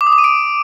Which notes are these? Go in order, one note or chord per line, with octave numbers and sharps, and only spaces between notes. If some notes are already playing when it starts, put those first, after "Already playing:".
D6
D#6
D6
D#7
D7